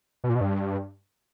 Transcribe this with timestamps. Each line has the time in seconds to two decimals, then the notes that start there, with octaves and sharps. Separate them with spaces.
0.24 B2
0.29 A#2
0.35 B2
0.41 G2